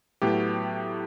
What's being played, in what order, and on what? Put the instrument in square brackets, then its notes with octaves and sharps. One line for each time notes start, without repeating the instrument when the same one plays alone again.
[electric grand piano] A2 F#3 B3 G4